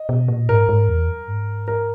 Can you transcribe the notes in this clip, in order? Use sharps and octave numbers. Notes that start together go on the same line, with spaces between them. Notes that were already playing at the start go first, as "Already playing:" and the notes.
Already playing: D#5
B2
A#2
G#2 A#4
G#2
E2
F#2
G#2
A#4